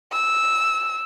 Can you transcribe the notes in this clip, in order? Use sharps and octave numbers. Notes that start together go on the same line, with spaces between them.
E6